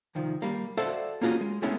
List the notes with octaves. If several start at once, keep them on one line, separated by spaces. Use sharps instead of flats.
C2 D#3 F3
G3 A#3
F#4 A4 C5 D5 E5 F5
A#3 C#4 F4 F#4 G#4
G#3
G#3 A3 B3 C#4 E4 G#4